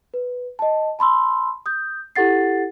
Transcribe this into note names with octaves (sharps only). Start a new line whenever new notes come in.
B4
D#5 A5
A5 B5 C6 E6
D#6 G6
E4 G4 A4 F#5 A6 C7